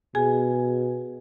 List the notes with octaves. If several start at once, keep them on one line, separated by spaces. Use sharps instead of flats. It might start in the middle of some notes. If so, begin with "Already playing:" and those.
B2 G#4 G#5